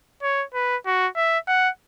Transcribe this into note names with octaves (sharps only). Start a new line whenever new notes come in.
C#5
B4
F#4
E5
F#5